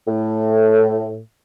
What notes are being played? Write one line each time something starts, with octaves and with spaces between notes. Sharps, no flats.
A2